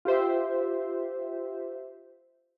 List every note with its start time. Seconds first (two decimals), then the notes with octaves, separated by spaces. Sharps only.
0.05 F4 G4 C5 E5